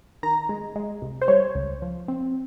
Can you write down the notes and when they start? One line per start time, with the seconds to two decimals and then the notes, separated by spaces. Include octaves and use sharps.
0.23 D#3 A#5
0.49 G#3
0.76 G#3
1.02 C2
1.22 C5
1.28 G3 C#5
1.55 C#2
1.82 F3
2.08 C4